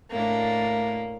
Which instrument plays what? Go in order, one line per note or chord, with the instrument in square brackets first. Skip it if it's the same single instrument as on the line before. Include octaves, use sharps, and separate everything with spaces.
[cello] A2 D4 [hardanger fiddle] A#3